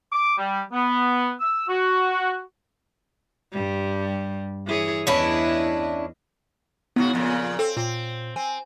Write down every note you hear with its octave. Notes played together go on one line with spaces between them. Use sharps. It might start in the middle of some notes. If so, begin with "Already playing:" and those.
D6
G3
B3
E6
F#4
G2 G3
E3 G#4 C#5
E2 C#4 D4 E4 B4 D#5
G#2 C#3 B3 F#4
F2 A#2 C#3
C4 A4
A#2 C4
C4 G#5